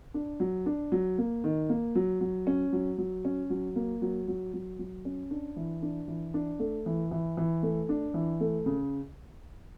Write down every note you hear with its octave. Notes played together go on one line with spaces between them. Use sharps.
D4
F#3
D4
F#3
A#3
D#3
A#3
F#3
F#3
C#4
F#3
F#3
C#4
F#3
A#3
F#3
F#3
F#3
F#3
C#4
D4
E3
D4
E3
D4
A3
E3
E3
E3
A3
D4
E3
A3
C#3